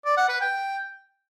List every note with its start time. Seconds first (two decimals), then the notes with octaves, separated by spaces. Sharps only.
0.05 D5
0.17 F#5
0.29 B4
0.41 G5